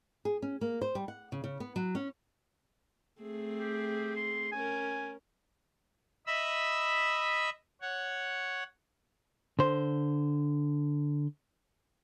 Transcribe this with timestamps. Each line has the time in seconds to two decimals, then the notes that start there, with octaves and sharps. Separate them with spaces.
0.25 G#4
0.42 C#4
0.61 A#3
0.82 C5
0.95 G3
1.08 F#5
1.32 C#3
1.44 C#3
1.60 B3
1.76 F#3
1.95 C#4
3.21 A3 C4 G#4
3.60 G4
4.16 C6
4.52 C#4 A#4 G#5
6.27 D#5 E5 B5 E6
7.81 C#5 F#5
9.59 D3 C5